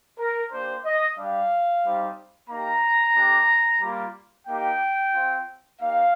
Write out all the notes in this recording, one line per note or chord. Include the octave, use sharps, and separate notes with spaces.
A#4
A#3 D4 G4 C5
D#5
G3 D4 G4 F5
G3 C4 D#4
A#3 D#4 G4 A#5
A3 D4 G4
G3 A#3 F4
A#3 D#4 G4 G5
C4 F4
A#3 D#4 G4 F5